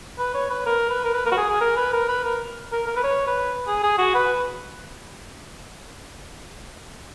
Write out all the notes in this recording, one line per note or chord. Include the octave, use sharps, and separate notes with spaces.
B4
C#5
B4
A#4
B4
A#4
B4
A#4
F#4
G#4
G#4
A#4
B4
A#4
B4
A#4
A#4
A#4
B4
C#5
B4
G#4
G#4
F#4
B4